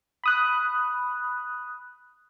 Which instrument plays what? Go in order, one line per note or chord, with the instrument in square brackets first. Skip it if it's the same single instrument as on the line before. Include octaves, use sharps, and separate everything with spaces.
[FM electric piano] B5 D#6 F#6